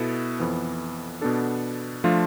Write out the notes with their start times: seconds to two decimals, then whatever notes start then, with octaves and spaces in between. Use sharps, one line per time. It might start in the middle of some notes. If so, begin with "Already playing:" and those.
Already playing: B2 B3 E4 A4
0.39 F2 E3 B3
1.21 B2 B3 D4 A4
2.04 F3 A3 D4 F4